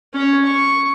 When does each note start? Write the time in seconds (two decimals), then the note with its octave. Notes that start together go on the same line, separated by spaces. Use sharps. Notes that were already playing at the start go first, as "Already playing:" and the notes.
0.14 C#4 C#5
0.46 C#6